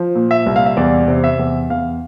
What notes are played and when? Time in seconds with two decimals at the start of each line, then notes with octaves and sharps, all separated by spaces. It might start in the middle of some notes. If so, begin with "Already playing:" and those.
Already playing: F3
0.15 A#2
0.31 E5
0.46 C2
0.56 F5
0.66 E5
0.77 E2 D5
1.08 C3
1.24 E5
1.39 E2
1.70 E2 F5